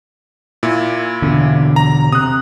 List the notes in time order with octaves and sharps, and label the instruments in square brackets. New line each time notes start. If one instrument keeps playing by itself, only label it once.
[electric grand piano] A#2 E4
[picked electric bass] E2 B2 D3
[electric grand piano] A#5
[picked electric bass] C3 [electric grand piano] D#6 F#6